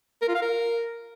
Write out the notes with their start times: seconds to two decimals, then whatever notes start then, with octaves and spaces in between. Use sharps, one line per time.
0.22 A#4
0.28 F4
0.35 F5
0.42 A#4